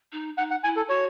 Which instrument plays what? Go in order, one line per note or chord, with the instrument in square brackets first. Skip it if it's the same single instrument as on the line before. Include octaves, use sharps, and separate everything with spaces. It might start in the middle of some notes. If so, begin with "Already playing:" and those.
[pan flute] D#4
[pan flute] D#4 [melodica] F#5
[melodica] F#5
[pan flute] E4 [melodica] G#5
[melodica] A4
[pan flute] F#4 [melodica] C#5